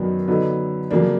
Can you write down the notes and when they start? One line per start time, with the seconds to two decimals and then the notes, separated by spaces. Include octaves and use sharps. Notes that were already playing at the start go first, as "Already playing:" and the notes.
Already playing: F#2 D#3 F#3 B3 D4
0.28 D3 F#3 B3 D#4
0.91 F2 C#3 F#3 A#3 D4